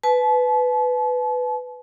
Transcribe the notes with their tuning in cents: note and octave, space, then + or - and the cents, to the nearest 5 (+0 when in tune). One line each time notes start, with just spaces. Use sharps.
B4 +10 A5 -40